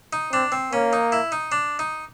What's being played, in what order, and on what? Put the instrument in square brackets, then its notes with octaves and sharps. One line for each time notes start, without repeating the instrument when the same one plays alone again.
[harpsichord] D#4
[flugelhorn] C4 [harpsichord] D4
[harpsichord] C4
[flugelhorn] A#3 [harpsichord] C#4
[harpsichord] D#4
E4
D#4
D4
D#4